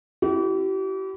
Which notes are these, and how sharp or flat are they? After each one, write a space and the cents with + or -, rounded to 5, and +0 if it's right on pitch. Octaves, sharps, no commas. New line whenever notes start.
E4 +20 G4 -40